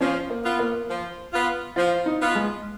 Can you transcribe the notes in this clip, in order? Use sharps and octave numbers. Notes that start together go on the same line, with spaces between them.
F3 C#4
A#3
B3 F4
A#3
F3
B3 F4
F3 F4
D#4
B3 F4
G#3